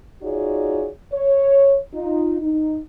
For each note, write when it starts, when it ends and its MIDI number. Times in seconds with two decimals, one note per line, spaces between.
0.22 0.87 63
0.22 0.87 65
0.22 0.87 66
0.22 0.87 68
0.22 0.87 73
0.22 0.87 74
1.13 1.77 73
1.93 2.36 63
1.93 2.36 65
2.41 2.78 63